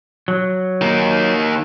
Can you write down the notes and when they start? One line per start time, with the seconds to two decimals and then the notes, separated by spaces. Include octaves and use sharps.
0.28 F#3
0.81 D#3 A#3